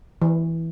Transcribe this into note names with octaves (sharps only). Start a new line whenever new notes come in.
E3